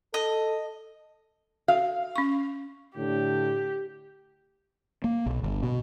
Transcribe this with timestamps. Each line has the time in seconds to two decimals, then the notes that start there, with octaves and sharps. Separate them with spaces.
0.14 A4 D#5
1.68 F#4 F5
2.16 C#4 C#6
2.96 A2 D3 G4
5.04 A#3
5.26 B1
5.43 G1
5.63 B2